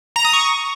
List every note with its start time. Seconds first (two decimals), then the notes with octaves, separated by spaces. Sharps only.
0.16 A#5
0.25 D#6
0.33 C#6